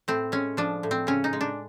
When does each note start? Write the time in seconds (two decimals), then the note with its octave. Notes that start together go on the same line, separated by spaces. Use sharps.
0.08 A2 C4
0.32 G#3 C#4
0.57 F3 D4
0.83 A2
0.91 C4
1.07 C#3 C#4
1.24 D#4
1.33 G#3
1.41 D4